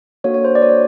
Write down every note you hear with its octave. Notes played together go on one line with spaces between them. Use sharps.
A#3 D4 F#4 A4 C#5
C#5
C5
D5
C#5
D5